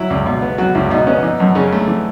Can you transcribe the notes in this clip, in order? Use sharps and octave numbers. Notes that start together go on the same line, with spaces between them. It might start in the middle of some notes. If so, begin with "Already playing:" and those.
Already playing: F#3 E4
C#2
B2
B3
F#3 F#4
C#2 E4
B2 D#4
B3 C#4
E3 D#4
F#2
C#3 C#4
A3
E3